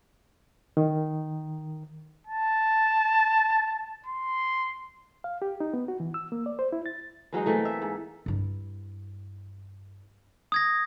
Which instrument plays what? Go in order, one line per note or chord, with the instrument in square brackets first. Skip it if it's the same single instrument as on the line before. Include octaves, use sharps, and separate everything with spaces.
[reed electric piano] D#3
[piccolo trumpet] A5
C6
[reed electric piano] F5
G4
D#4
B3
F#4
E3
E6
A#3
D5
C5
E4
A6
[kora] E3 F#3 G#3 D#4
E3 A3 A#3 C4
E5
G#2
[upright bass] G2 E4
[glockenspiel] D#6 G#6 A#6